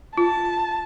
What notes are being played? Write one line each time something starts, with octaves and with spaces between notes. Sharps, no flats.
F4 A5